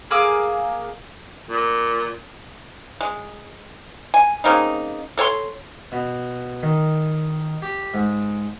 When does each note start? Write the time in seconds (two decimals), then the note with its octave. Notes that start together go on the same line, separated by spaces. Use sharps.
0.11 A#3 G#4 D6 E6
1.50 A#2
3.01 G#3
4.14 G#5
4.44 C#3 A#3 C4 D#4
5.17 A4 C#5 G5 C6
5.92 B2
6.63 D#3
7.62 G4
7.94 G#2